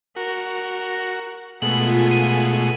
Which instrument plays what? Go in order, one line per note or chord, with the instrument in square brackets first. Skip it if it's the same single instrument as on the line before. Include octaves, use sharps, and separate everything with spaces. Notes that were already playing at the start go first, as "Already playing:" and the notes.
[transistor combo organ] F#4 [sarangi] A#4
[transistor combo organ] B2 G#3 A3 [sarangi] B3 [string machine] F4 G#5 [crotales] F#7
[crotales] D#7